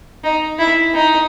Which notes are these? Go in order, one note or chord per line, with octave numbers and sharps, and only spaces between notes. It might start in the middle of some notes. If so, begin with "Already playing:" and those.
D#4
E4
D#4